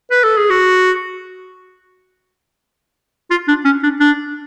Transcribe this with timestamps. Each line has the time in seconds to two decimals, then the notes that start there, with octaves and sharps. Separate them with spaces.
0.11 B4
0.24 A4
0.37 G#4
0.50 F#4
3.30 F4
3.48 D4
3.65 C#4
3.83 D4
4.00 D4